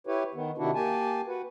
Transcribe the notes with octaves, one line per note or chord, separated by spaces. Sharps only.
E4 G4 B4 C#5
D#3 B3
C3 D#3 D4 E4 F#4
A#3 G4 G#5 A5
F#4 B4